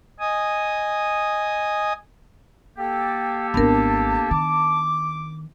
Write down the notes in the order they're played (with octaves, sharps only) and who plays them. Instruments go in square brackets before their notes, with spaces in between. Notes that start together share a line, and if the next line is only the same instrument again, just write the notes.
[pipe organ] D#5 G#5 D#6
[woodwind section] A#3 G4 A4 [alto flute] G5
[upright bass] G#1 C4 [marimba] B3 D4 A#4 [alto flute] A5
[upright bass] D#3 [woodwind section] D6